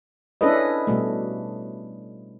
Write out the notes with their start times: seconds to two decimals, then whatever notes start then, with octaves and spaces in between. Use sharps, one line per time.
0.41 C#4 D4 E4 A4 B4 D#5
0.87 B2 G3 A3